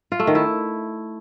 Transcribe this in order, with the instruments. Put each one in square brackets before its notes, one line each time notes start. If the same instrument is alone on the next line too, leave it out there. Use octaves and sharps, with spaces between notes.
[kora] F4
A3
D#3
E4